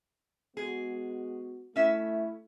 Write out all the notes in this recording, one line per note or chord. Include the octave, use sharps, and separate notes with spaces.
G#3 B3 F#4 G#4
A3 C#4 E4 E5